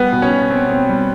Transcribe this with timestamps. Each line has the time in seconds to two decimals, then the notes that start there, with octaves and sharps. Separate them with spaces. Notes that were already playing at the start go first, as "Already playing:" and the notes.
Already playing: G3 B3 B4
0.13 B2
0.22 C#4 C#5
0.31 B2
0.50 C4
0.69 C4
0.89 G3